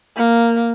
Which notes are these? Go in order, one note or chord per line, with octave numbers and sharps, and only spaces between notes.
A#3